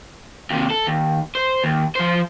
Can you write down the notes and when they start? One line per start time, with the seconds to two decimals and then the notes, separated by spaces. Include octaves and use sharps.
0.50 D#2 C3
0.70 A4
0.87 D#2
1.35 C5
1.64 D#2
1.95 F3 C5